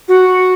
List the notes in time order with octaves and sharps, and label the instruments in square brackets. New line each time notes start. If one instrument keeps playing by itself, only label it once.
[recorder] F#4